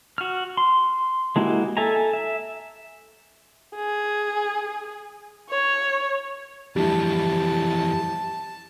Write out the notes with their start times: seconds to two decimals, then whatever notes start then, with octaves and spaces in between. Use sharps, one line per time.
0.18 F#4 F6
0.57 C6
1.36 G#3 A#3 E4 F#4 G4
1.77 A4 E5 G#5 A#5
2.13 E5
3.76 G#4
5.50 C#5
6.76 F2 A2 E3 G3 G4 A5